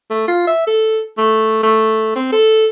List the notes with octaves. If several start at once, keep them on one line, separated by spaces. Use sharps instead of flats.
A3
F4
E5
A4
A3
A3
C4
A4